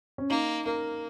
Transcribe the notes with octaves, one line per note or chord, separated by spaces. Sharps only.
C#4
A#3 D#4
A#3 A#4